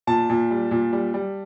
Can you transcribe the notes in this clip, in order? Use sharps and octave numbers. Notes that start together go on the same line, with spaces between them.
A#2 A5
A#2
G3
A#2
G3
G3